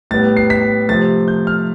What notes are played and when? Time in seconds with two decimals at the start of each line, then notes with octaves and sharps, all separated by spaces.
0.11 A2 G3 B3 A6
0.37 C7
0.50 B6
0.88 C3 F3 A3 A6
1.28 G6
1.47 F6